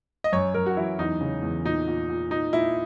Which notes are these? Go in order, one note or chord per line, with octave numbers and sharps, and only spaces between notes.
D#5
F#2 C#5
F#2 A#4
F#4
E3 E4
E2 D#4
C#3
E2
A#2 D#4
A#2
A#2
A#2 D#4
A#2 E4